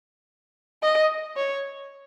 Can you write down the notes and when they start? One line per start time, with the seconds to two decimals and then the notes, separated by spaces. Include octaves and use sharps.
0.82 D#5
1.36 C#5